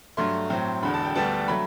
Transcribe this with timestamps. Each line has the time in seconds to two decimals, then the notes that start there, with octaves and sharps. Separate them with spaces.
0.17 G2 F#3 A3 C6
0.50 A2 F#3 C4
0.83 E1 E2 D3 B5
0.94 A5
1.04 G5
1.15 D2 D3 G3 B3 D4 A5
1.48 F#3 A3 B5